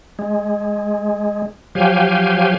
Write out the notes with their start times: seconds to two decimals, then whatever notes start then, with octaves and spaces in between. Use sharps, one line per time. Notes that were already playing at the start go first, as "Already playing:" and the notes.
0.19 G#3
1.75 F3 F#3 G4 F5 G5 G#5